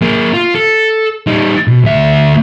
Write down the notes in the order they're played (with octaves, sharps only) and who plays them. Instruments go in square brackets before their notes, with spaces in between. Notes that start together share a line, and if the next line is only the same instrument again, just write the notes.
[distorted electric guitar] A#3 G#4
F4
A4
G3 D#4
B2
D2 E5